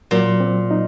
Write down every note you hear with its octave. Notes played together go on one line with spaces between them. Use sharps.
A#2 F#3
C4
D#4